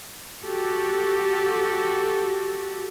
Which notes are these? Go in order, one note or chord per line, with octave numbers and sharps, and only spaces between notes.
F#4 G4 A4